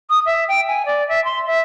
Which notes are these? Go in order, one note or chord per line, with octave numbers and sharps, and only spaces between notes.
D#6
E5
G5
G#5
D5
E5
C6
E5